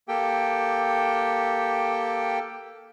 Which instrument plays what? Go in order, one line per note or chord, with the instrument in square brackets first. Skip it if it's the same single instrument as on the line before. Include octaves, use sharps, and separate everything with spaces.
[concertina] A#3 G4 A4 G5